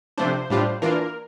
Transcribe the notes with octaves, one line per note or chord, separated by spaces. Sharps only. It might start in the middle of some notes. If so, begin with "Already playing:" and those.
C3 F3 A3 D4 C5
A2 G3 D4 F4
E3 A#3 D4 F4 A#4